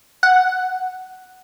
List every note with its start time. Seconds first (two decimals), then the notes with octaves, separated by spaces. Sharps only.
0.23 F#5